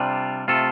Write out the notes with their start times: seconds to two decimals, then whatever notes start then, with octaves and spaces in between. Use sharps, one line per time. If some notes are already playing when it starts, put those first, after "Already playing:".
Already playing: C3 G3 D4 F4
0.48 C3 A3 F4 A4